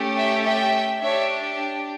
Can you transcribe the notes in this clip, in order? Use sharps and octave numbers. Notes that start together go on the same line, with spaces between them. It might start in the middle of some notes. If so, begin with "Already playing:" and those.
Already playing: A3 C#4 G4
E5 G5
E5 G5
D4 G4 C#5 E5